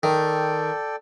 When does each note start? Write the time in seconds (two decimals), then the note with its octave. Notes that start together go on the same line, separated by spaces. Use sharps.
0.03 D#3 A4 D5 G5